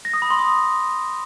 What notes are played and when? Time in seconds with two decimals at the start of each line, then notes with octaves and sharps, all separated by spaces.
0.05 A#6
0.14 D#6
0.22 B5
0.31 C6
0.39 D#6